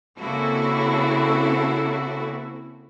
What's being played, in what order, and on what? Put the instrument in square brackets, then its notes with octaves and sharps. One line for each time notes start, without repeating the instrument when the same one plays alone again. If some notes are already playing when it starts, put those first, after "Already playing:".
[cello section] C#3 A#3 C4 E4 F#4 A4